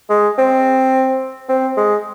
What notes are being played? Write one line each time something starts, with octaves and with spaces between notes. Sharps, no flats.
G#3
C4
C4
G#3